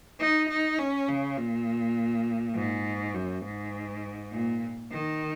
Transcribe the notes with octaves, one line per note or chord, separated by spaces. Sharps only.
D#4
D#4
C#4
C#3
A#2
G#2
F#2
G#2
A#2
D#3